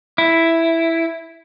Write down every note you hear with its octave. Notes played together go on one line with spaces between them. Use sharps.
E4